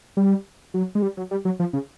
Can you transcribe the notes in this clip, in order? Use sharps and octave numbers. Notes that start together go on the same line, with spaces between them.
G3
F#3
G#3
G3
F#3
G3
F#3
F3
C#3